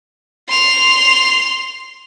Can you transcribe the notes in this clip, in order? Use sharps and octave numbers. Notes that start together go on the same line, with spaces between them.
C6 F7